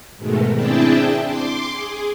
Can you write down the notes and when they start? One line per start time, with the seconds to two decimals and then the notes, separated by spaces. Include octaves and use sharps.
0.18 G#2 B2 D#3 G#3 A3
0.54 C4 D4 E4 G#4 G5 A5
1.22 C6 D6
1.71 G#4